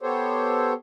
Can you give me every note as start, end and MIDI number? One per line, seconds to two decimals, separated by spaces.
0.02 0.73 59
0.02 0.73 67
0.02 0.73 69
0.02 0.73 72
0.02 0.73 73